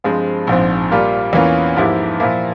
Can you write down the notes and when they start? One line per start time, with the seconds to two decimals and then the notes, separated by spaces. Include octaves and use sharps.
0.04 G2 F3 G#3 C4
0.47 A#1 G#2 F3 C4
0.91 A#2 G3 A#3 F4
1.33 E2 E3 A#3 C#4 F4
1.76 G#2 F3 A#3 E4 G4
2.20 A#2 F3 A#3 E4